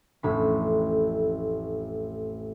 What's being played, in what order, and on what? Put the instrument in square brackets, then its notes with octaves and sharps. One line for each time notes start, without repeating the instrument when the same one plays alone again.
[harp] A1 F2 A2 B5